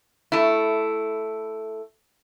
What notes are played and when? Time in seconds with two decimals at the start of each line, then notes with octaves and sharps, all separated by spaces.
0.32 A3 E4